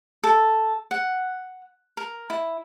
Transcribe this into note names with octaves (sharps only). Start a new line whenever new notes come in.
A4
F#5
A#4
E4